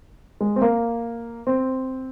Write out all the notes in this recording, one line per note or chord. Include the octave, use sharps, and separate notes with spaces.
G#3
C4
A#3
C4